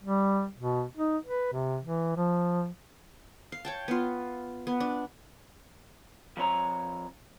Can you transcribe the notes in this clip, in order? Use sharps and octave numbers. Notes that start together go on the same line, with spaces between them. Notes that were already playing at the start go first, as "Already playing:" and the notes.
G3
B2
D#4
B4
C3
E3
F3
F5
C#5 G5 A5
B3 F4
B3
D4
F3 C4 C#5 A#5